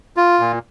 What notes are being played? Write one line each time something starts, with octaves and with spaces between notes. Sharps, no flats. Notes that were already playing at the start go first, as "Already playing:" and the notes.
F4
A#2